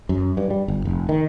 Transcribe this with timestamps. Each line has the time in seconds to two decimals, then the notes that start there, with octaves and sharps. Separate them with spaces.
0.09 F#2
0.37 G2
0.50 G3
0.68 G1
0.85 F1
1.09 D#3